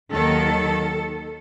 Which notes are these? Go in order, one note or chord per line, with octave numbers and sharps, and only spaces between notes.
D#2 D#3 F#3 A4